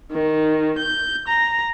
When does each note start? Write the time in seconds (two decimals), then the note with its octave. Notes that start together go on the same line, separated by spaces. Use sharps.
0.12 D#3
0.78 G6
1.27 A#5